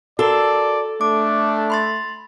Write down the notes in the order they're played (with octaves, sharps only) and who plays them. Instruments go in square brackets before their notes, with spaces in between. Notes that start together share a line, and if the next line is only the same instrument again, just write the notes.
[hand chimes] F#4 A#4 [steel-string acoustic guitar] A4 [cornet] D5
[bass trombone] A3 [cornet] D4 [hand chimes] D6
[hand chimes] B5 C6 A6